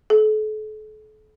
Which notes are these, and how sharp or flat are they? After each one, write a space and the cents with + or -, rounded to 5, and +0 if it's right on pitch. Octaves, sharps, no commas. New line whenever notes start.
A4 -40